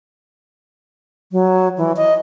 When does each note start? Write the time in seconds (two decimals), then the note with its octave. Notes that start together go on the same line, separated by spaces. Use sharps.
1.32 F#3
1.78 E3
1.97 D#5